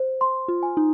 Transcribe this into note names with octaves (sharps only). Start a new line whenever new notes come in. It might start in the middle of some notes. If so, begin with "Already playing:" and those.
Already playing: C5
C6
F4
G#5
D#4